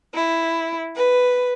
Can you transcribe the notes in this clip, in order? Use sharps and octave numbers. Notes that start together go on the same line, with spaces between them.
E4
B4